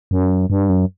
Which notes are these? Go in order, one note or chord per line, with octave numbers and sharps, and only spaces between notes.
F#2
G2
F#2